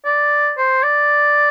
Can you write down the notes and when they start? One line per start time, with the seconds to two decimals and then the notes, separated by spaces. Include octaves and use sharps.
0.05 D5
0.57 C5
0.83 D5